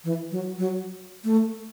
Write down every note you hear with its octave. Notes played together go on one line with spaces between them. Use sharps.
E3
F#3
F#3
A3